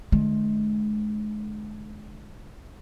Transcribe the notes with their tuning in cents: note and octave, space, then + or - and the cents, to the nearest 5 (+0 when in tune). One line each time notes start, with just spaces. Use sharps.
D3 +30 G#3 +35